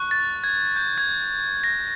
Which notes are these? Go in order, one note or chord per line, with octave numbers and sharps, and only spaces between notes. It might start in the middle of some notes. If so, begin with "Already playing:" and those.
Already playing: C#6 F#6
A6
G#6
G6
G#6
A#6